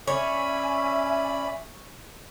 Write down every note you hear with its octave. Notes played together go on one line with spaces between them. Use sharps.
C#4 C#5 D5 E5 G#5 B5